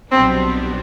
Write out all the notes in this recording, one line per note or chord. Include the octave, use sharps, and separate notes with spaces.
B1 B2 G3 B3 C4 D4